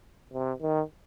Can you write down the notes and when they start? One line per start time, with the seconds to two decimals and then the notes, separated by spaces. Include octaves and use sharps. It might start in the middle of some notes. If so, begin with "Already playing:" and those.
0.33 C3
0.61 D#3